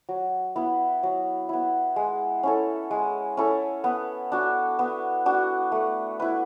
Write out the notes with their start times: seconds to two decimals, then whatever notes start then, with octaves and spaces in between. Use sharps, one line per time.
0.09 F#3
0.56 B3 E4
1.03 F#3
1.49 B3 E4
1.96 G#3
2.43 C#4 E4 A4
2.91 G#3
3.37 C#4 E4 A4
3.84 B3
4.32 D4 F#4
4.79 B3
5.26 D4 F#4
5.72 A3
6.20 E4 B4